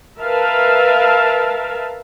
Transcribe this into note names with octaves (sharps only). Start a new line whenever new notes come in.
A#4 B4 E5 F5 A5